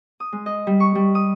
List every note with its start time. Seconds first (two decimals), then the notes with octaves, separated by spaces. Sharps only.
0.20 D#6
0.33 G#3
0.46 D#5
0.67 G3
0.80 C#6
0.95 G3
1.15 D#6